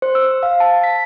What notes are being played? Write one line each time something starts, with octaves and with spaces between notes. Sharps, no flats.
C5
E6
F5
A5
B6